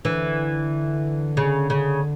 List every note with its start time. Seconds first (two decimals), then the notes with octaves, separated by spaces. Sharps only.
0.05 D3 E3
1.37 C#3
1.70 C#3